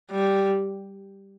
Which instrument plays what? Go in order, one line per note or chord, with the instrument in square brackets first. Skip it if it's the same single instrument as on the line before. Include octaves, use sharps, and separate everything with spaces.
[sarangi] G3